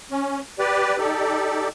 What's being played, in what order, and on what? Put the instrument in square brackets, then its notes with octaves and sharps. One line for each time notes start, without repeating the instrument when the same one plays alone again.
[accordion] C#4
G4 B4 D5
D#4 G4 A4 D5